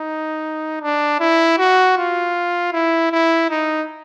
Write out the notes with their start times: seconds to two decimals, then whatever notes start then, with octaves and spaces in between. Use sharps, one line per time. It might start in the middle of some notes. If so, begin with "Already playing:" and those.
Already playing: D#4
0.82 D4
1.20 E4
1.58 F#4
1.97 F4
2.73 E4
3.12 E4
3.50 D#4